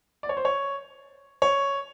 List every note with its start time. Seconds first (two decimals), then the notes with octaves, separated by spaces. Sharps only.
0.23 D5
0.29 C#5
0.37 C5
0.45 C#5
1.42 C#5